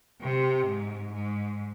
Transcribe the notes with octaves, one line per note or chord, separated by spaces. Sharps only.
C3
G#2
G#2